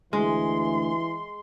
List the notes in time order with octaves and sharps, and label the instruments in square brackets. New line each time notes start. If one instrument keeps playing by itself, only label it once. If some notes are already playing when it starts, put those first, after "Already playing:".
[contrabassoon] D2 [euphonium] E3 [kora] G#3 [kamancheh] C6